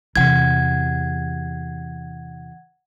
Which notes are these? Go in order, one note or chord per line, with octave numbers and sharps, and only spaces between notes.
E2 C3 F#5 G#6